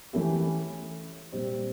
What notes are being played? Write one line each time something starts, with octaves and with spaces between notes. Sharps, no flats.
E3 A3 C#4 E4 G4
A#2 G3 C4